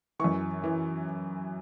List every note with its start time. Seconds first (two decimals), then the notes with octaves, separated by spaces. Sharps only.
0.19 F#2 E3 C#6
0.64 E3